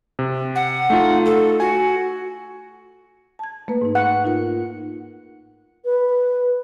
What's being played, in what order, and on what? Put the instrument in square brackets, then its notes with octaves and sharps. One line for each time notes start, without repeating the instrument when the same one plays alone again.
[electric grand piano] C3
[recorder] F#5
[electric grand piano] A3 D#4 F4
[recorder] A4
[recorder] F#4 [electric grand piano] G#5
[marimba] A5 G#6
A3 A#3 B4
G#2 D#4
[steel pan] F#5
[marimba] D#4 F4 A#4
[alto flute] B4